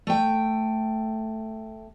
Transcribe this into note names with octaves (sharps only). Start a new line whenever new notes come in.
A3 G5